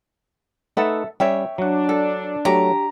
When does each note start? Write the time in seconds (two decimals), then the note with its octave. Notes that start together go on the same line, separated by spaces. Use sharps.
0.77 A3 D#4 A4 B4 E5 F#5
1.20 G3 C#4 C#5 E5 G5
1.58 F#3 D4 F#5
1.89 A4
2.45 F#3 A3 G4 A#5